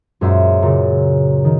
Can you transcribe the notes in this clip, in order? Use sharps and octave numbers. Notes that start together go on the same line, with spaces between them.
F#2 A#2 G#3 C#4 C5 E5
A#2 C#3
D#3